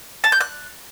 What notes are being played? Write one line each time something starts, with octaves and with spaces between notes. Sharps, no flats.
A5
G6
F#6